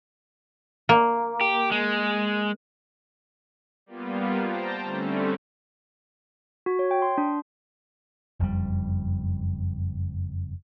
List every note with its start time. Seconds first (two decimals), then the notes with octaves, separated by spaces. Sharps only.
0.89 A#3
1.41 G4
1.71 G#3
3.86 G3 A#3 B3 F4
4.44 C5 G5 A5 A#5
4.83 D3 G3 A3 C4 C#4
6.66 F#4
6.79 C#5
6.91 G5
7.02 C6
7.18 D4
8.40 F#1 F2 A2 G3